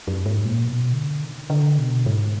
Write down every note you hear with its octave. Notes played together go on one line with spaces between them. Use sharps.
F#2
G#2
A#2
B2
D3
D#3
D3
B2
G#2